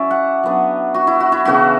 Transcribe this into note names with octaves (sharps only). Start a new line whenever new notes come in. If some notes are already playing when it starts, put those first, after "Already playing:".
Already playing: F#3 C#4 E4 D5 E5
F#5
F#3 B3 D4
F#4
E4
F#4
E4
C#3 E3 B3 D4 F#4